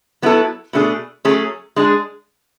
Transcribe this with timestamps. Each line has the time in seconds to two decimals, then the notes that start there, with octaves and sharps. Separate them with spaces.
0.22 F#3 B3 E4 A4
0.73 B2 A3 D4 G#4
1.25 F#3 A3 C#4 G#4
1.76 G#3 D4 G#4